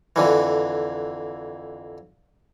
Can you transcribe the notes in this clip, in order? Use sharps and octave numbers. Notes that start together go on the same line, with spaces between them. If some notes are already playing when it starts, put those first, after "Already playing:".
F2 D3 E3